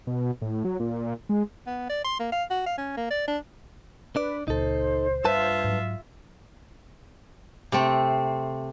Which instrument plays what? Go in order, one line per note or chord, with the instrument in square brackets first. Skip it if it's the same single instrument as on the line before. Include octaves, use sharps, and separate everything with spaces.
[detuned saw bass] B2
A2
F#3
A#2
G#3
[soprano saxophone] B3
D5
C6
A#3
F5
F#4
F5
C#4
A#3
D5
D4
[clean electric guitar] D4 D5 [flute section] B4
[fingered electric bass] C#2 A#2 [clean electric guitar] D#4 A4 [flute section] C5
[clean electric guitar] G2 B4 A5 [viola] F4 E5
[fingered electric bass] G#2 F#3
[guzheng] C3 A3 C4